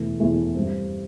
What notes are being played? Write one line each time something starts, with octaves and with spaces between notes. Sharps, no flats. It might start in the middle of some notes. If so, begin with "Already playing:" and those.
Already playing: E1 E2 E3 A3
E1 E2 E3 A3
G2 G3 C4